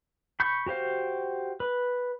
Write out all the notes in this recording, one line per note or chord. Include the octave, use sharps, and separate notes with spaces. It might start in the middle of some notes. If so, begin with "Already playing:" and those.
B5 C#6 G6
F#4 G4 C5 F5
B4